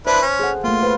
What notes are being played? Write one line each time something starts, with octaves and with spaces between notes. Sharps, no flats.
D4 E4 B4 C5
C#4
G#4 A4 F#5
A3 A#3 F4
B4 C5 F5